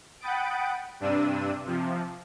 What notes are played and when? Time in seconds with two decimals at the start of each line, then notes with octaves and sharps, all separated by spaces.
0.20 F#5 G5 B5 D#6 A6 D7
1.00 G2 C3 D4 E6 D#7
1.65 C3 F3